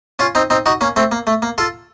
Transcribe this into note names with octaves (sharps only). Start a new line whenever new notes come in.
C#4 F4
C4 D#4
C4 D#4
D#4 F#4
A#3 C#4
A3 C4
A#3
A3
A#3
F4 A4